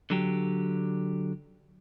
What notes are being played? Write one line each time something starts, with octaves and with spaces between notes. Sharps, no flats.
D3 F#3 G4